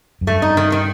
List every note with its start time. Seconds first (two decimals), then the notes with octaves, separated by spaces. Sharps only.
0.21 F#2
0.27 G2 A3
0.42 D#4
0.57 D#3
0.72 D#3